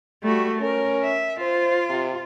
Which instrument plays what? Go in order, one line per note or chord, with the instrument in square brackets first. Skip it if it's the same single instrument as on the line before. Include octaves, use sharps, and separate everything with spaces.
[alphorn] G3 [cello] A3 F#4
[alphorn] C#4 [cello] A#4
[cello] E5
[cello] F4 [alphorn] C5
[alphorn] C3